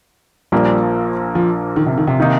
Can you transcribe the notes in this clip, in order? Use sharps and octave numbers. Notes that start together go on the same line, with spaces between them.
A#1 A#2 F3 G3 A#3
F3
D#3
C3
D#3
C3
D#3 A#3 D#4